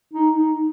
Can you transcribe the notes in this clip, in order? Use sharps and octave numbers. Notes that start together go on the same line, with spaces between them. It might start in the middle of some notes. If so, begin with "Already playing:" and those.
D#4
D#4